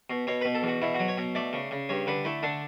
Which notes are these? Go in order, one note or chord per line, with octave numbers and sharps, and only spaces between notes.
B2
B2 C#5
B2 B4
A4
E2
F#4
B2 E4
F#3 F#4
C#5
B2
A3 D5
C#3
C#3
G2 C#5
D3 B4
A3 E4
D3 D4